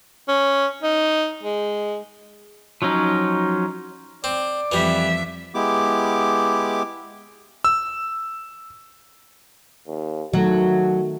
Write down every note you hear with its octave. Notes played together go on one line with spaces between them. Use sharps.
C#4
D#4
G#3
F3 F#3 C#4 D#4
C4 D5
F2 E3 G3 E5
G#3 B3 E4 G4 D6
E6
D#2
D#3 F#3 A3 F#4 A4